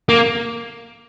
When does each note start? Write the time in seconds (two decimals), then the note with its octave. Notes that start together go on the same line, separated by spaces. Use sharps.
0.09 A#3